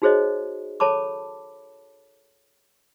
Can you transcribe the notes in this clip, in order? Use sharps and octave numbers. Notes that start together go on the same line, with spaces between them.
D#4 F#4 G#4 C5 C#5 D#5
A4 C#5 A5 B5 D6